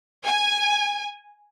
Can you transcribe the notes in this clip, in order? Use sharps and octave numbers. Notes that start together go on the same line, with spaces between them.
G#5